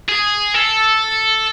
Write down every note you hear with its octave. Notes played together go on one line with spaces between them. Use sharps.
G#4
A4